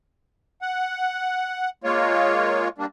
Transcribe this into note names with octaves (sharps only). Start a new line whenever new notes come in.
F#5
G#3 A#3 F4 C#5
G3 A#3 D4